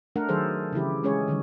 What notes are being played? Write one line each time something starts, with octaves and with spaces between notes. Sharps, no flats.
A3 D4 A#4 F#5
D#3 F#3 G#4 A4 C5
C#3 E3 E4 G4
G#3 C#4 G#4 C#5
D3 D#3 F#3